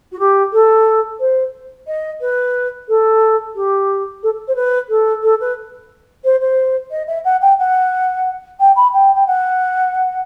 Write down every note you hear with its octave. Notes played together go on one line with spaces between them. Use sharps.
F#4
G4
A4
C5
D#5
B4
A4
G4
A4
C5
B4
A4
A4
B4
C5
C5
D#5
E5
F#5
G5
F#5
G5
B5
G5
G5
F#5